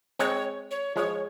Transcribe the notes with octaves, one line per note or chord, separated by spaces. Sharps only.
G#3 C4 C#5
C#5
F3 G#3 C#5